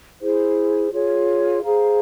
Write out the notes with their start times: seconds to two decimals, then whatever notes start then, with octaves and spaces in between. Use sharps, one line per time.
0.21 E4 G#4 C5
0.91 F4 G#4 C#5
1.63 G#4 C5 F5 A#5